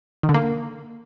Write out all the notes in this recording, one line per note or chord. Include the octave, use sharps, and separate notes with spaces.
D#3
D3
A#3